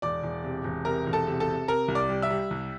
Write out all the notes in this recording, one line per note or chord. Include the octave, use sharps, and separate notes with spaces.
E1 D5 D6
E1
C3
E1
C3 A#4 A#5
E1
A4 A5
C3
A4 A5
C3
C3 A#4 A#5
C2
D5 D6
G3
E5 E6
G3
C2